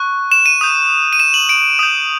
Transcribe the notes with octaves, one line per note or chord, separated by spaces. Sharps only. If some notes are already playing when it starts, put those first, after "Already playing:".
Already playing: C#6 F#6
E7
D#7
D#6 G6
D#7
E7
F#7
D7
D#6 G6